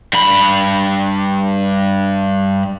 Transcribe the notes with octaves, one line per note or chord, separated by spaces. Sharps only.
G2 B5